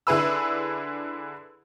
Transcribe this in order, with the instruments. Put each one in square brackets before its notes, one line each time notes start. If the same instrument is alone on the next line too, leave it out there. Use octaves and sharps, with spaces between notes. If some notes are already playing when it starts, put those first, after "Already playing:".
[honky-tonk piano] D3 E4 G#4 B4 B5 E6